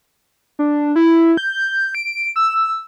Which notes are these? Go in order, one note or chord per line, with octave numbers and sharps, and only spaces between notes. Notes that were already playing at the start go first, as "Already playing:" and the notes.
D4
E4
G6
D7
E6